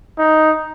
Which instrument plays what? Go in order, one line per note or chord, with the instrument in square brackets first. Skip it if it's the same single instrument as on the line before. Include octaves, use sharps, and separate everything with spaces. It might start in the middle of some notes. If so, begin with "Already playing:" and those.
[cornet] D#4